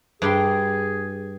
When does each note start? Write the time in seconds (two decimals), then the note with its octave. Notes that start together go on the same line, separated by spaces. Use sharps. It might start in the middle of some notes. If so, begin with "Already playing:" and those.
0.22 G2 G4 G#4 C6